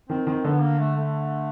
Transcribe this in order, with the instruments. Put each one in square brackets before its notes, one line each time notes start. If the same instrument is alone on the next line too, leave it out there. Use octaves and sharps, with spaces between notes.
[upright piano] D#3 [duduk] C4
[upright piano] D#3 [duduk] C4
[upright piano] D3 [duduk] B3
[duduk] A#3
A3
A3